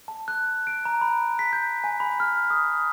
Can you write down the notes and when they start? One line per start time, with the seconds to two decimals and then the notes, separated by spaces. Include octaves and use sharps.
0.08 A5
0.28 F#6
0.67 D7
0.85 A#5
1.01 B5
1.39 B6
1.53 G6
1.84 G#5
2.00 B5
2.20 F6
2.50 D#6